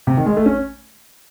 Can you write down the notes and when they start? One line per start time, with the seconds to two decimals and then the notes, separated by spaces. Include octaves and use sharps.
0.07 C3
0.17 D#3
0.26 G#3
0.37 A3
0.46 C#4